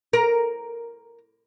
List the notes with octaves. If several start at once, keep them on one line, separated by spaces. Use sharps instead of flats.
A#4